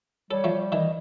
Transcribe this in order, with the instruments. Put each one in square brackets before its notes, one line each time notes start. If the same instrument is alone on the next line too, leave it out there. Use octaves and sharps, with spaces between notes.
[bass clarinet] G3 [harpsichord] A4 [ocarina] C#5
[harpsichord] F3 A3
[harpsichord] D#3 E3 [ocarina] D#5